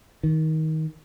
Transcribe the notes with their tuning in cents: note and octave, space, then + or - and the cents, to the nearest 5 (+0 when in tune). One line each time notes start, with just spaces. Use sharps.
D#3 +20